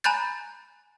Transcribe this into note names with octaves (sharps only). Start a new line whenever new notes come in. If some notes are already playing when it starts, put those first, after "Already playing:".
G#5 A#5 B5 F#6 G6 A6